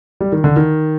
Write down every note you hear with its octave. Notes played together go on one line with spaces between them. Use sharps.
G3
D#3
D3
D#3